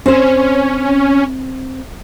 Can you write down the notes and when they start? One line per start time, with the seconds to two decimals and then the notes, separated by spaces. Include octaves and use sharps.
0.06 C4 C#4 C5